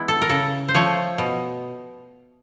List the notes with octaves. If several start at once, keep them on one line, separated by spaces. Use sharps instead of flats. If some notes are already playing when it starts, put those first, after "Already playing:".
Already playing: E3 G#3 B3 E4
A4
A#4
C#3 A4
C5
F3 A3 C#5
B2